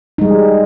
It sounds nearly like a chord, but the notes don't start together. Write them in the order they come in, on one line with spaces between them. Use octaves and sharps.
D#4 G#3 G3